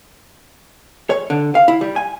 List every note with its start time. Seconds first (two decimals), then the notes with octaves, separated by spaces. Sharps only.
1.10 C#5
1.30 D3
1.55 F5
1.68 E4
1.81 G3
1.96 G#5